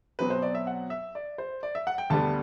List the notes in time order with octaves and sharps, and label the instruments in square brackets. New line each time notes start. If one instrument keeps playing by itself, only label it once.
[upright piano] B2 F#3 C4 B4
C5
D5
E5
F#5
E5
D5
C5
D5
E5
F#5
G5
D2 D3 G3 B3 D4 A5